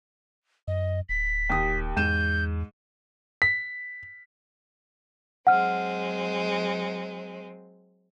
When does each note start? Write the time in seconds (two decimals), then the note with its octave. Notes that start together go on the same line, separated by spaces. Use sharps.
0.68 F#2 D#5
1.09 D1 B6
1.50 D#2 G4 D#6
1.97 E2 G#2 G6 D#7 E7
3.42 B6
5.47 F#3 G#3 C4 F#5 F6